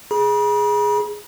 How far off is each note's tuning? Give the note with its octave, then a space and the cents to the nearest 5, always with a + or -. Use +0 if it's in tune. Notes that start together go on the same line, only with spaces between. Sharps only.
G#4 +0 B5 -45